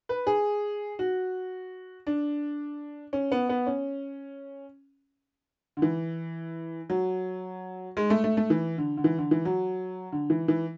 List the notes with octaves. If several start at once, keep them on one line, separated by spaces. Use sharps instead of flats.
B4
G#4
F#4
D4
C#4
B3
B3
C#4
D3
E3
F#3
G#3
A3
A3
A3
E3
D3
D3
E3
D3
E3
F#3
D3
E3
E3